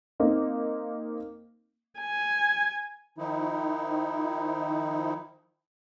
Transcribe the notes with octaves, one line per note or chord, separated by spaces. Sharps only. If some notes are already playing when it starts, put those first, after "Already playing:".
A#3 C4 D#4
G#5
D#3 F3 D#4 E4